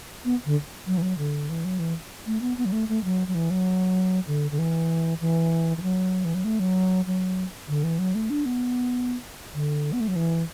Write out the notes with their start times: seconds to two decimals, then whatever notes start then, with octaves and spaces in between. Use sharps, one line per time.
0.25 B3
0.46 D3
0.87 F#3
0.98 E3
1.02 F#3
1.18 D3
1.49 E3
1.65 F#3
1.79 E3
2.26 A3
2.42 B3
2.57 B3
2.65 F#3
2.72 A3
2.89 A3
3.04 F#3
3.28 F#3
3.35 E3
3.50 F#3
4.27 D3
4.51 D3
4.59 E3
5.20 E3
5.77 E3
5.82 F#3
6.25 E3
6.35 F#3
6.44 A3
6.60 F#3
7.06 F#3
7.68 D3
7.84 E3
7.99 F#3
8.15 A3
8.30 D4
8.46 B3
9.54 D3
9.93 B3
10.00 A3
10.08 F#3
10.16 E3